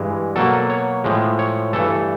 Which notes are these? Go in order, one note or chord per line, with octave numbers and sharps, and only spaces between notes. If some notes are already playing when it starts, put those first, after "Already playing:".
Already playing: G2 E3 G#3
B2 F#3 A#3 A4
C#5
A2 F3 G#3
C#5
G2 E3 A3 A4